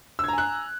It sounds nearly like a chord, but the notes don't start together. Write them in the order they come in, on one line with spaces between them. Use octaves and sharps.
E6 G#6 A#5 G#5 F#6